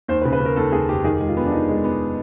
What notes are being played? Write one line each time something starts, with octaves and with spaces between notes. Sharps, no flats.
D#2 C5
B4
C#3
B4
C#3
A#4
D#2 A4
D#2 G#4
F1 G4
D#3 G#4
G#3 G4
F4
B3
D4
D#3 D#4
G#3
B3